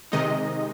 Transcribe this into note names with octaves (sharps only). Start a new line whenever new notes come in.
C3 D#3 G#3 D#4 D#5